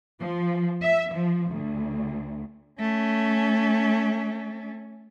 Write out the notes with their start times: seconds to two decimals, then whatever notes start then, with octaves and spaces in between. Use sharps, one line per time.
0.19 F3
0.82 E5
1.13 F3
1.50 D2
2.80 A3 C#4